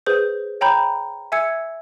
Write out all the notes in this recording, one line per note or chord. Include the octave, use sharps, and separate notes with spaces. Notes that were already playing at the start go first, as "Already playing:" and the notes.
G#4 B4 C5 G6
C#5 G5 A#5 B5 G6
E5 G#5 E6 G#6 C#7